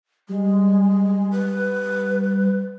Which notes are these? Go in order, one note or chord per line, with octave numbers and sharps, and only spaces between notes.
G3 G#3
B4